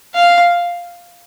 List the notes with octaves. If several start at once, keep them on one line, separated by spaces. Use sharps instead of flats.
F5